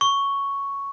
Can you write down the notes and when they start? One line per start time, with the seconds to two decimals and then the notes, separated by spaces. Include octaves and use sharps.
0.01 C#6